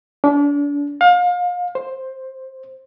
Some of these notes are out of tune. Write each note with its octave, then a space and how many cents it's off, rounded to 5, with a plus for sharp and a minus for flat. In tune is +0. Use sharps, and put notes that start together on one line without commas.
D4 -35
F5 +35
C5 +10